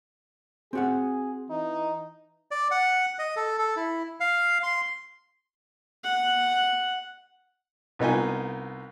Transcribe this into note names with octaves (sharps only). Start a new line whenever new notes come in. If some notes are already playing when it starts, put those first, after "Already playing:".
C4 F#4 G#4 F#5
E3 D#4
D5
F#5
D#5
A4
A4
E4
F5
C6
F#5
C2 B3 D#4 F4 G#5